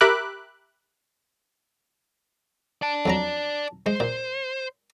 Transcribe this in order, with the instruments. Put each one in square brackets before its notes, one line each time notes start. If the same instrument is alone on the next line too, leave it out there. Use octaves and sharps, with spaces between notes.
[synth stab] G4 A#4 E5 B5 D6 F#6
[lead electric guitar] D5 A5
[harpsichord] F2 F#3 A#5
[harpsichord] G#3 [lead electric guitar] C5
[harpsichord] A#2